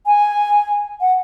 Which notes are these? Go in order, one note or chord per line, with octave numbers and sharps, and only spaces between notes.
G#5
F#5